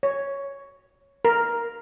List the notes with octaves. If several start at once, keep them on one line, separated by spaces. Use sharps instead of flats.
C#5
A#4